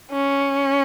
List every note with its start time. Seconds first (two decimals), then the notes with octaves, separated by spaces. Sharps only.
0.12 C#4